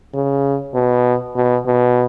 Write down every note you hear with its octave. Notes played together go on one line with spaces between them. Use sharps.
C#3
B2
B2
B2